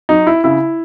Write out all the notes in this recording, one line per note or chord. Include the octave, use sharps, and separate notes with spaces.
F#3 D#4
E4
C#3 E4